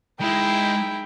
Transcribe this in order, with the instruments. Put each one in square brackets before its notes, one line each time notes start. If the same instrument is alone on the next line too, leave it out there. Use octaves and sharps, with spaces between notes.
[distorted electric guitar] G#3 [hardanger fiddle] D#4 E4 [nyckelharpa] G5